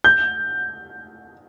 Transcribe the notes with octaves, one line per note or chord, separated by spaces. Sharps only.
G6